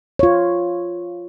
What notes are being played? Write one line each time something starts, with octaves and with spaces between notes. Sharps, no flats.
F4 C#5